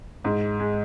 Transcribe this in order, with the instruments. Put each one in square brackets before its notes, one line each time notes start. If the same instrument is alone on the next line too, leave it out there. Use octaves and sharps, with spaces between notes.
[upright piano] G#2
G#3